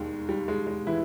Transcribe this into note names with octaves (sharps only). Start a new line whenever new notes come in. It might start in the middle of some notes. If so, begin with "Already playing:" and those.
Already playing: E1 D#2 D#3 G#3
G3
G#3
G#3
E3 E4